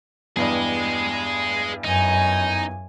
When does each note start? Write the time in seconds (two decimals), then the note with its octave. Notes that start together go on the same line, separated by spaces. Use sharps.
0.36 E2 G2 G3 G#4 D#5
1.84 F#2 D#4 G#5